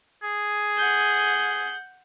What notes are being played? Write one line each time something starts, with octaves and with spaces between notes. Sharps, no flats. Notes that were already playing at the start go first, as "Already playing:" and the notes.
G#4
F#5 G6